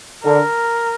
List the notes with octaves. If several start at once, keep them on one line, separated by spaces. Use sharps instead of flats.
D3 A#4